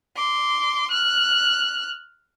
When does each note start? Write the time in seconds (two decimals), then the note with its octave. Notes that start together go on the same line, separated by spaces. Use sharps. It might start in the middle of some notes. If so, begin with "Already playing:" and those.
0.15 C6 D6
0.92 F6 F#6